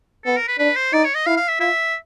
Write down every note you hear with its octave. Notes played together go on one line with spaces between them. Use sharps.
B3 A4
A#4
B4
D4 B4
C5
D#4 D5
C#5
D#5
E4 F5
F5
E5
F4 E5